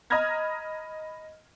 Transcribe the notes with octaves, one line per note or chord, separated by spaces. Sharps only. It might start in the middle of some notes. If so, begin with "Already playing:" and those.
D#5 A#5 B5 F6 G#6 A#6